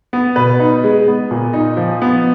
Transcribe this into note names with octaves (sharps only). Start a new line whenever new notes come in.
B3
B2 B4
D#4
G#3
B3
A#2
D#4
F3
B3